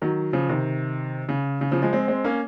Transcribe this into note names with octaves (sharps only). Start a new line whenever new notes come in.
D#3 F#3
C#3 F3
C3 D#3
C#3
C#3
C#3 F3
F3 G#3
G#3 C4
G#3 C4
A#3 C#4